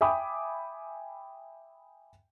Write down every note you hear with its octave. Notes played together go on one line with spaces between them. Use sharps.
E5 G5 G#5 B5 D6 D#6